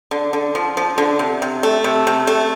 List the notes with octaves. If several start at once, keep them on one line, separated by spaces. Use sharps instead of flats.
D3
D3
F3
F3
D3
C3
C3
A3
C3
C3
A3